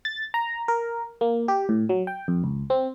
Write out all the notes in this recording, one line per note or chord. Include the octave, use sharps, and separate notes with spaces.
A6
A#5
A#4
A#3
G4
A2
F#3
G5
F2
C#2
C4